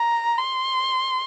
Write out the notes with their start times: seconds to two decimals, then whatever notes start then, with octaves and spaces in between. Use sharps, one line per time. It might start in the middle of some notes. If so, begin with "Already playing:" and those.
Already playing: A#5
0.38 C6